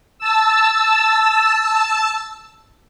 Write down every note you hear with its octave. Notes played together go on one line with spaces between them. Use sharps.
A5 E6